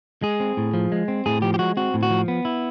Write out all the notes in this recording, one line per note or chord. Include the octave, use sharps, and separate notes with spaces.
G#3 G#4
C4
A2
F3
G#3
C4
A2 G#4
F3 G4
G4
G#3 F#4
C4 F#4
A2
F#4
F3
B3
E4